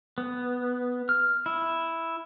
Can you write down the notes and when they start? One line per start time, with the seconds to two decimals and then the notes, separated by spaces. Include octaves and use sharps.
0.18 B3
1.09 F6
1.46 E4